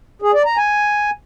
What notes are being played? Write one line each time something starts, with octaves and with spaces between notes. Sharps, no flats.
G#4
D5
A#5
G#5